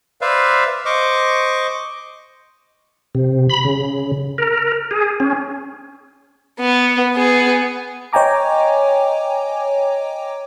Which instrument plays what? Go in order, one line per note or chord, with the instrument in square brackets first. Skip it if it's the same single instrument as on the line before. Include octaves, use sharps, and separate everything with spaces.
[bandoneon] B4 C5 D5 E5 F5
C5 D#5 C#6 D6
[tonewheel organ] C3
B5
C#3
A#4
G#4
C#4
[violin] B3
B3 G#4
[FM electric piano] C#5 D#5 G5 G#5 A#5 D6